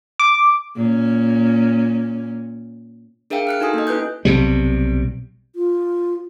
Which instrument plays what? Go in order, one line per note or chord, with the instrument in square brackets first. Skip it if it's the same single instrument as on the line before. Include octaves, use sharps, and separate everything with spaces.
[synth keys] D6
[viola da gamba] A#2 C#4
[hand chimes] D4 G#4 A#4 E5 F5 G5
F6 F#6 C#7
D#4 F#4 A4 G#5 D#6
A#3 D#5
C#4 E4 B4 F#6 G6
[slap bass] B1 C3 G3
[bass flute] F4